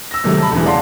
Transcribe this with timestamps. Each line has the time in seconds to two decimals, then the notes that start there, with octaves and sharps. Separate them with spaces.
0.11 E6 A#6
0.24 G#2 C3 D#3 F#3 A3
0.38 A5 B5
0.52 E1 G#2 C#3 E3
0.65 D5 F5 F#5 A5 C6